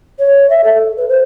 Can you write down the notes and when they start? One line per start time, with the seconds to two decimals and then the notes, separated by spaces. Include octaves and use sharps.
0.18 C#5
0.49 E5
0.64 A4
0.97 B4
1.08 C5